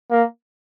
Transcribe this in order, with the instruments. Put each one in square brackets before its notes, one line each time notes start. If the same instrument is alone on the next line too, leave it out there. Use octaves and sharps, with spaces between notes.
[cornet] A#3